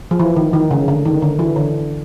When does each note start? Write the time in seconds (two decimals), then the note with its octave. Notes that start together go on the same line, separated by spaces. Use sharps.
0.11 F3
0.19 E3
0.36 D#3
0.53 D#3
0.71 C#3
0.88 D3
1.05 D#3
1.22 D3
1.39 E3
1.56 D3